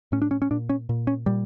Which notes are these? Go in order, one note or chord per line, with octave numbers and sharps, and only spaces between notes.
A2 C#4
D4
C#4
C#4
A#2 D4
C#4
A#2
C#4
A#2 G3